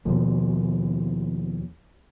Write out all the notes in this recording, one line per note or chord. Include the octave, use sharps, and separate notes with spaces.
D#2 B2 F3 A#3